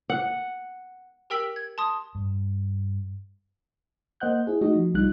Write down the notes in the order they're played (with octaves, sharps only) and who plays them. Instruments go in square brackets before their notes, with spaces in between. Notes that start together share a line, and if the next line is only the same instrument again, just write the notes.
[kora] F#5
[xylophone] G4 A#4 G5 E6 B6 F#7
G#6
A5 C6 D#6
[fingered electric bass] G2
[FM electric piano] A#3 C5 D#5 F#5 F#6 G6
E4 G#4
A3 D#4 F#4 D#5
F3
C2 G3 D#4 F4 F#6